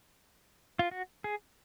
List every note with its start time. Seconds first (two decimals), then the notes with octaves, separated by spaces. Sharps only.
0.79 F4
0.91 F#4
1.24 G#4